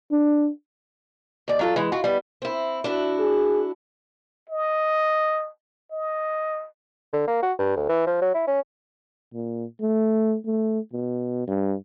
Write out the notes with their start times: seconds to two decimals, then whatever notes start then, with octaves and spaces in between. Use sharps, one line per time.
0.11 D4
1.48 D#2 D5
1.59 F#3 F4 A4
1.76 E3 G#3
1.92 F4 F#4
2.04 G3 B3
2.42 C4 E4
2.84 D4 E4 F#4
3.19 G#4
4.49 D#5
5.91 D#5
7.13 D3
7.27 A#3
7.42 F#4
7.59 G2
7.76 D2
7.89 E3
8.07 F3
8.21 F#3
8.34 E4
8.47 C#4
9.34 A#2
9.81 A3
10.46 A3
10.93 B2
11.47 G2